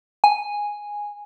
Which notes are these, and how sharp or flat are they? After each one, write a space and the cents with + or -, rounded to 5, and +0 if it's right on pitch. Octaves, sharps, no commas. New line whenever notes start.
G#5 -5